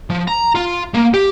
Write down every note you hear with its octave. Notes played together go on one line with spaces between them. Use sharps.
F3
A#5
F4
A#3
G4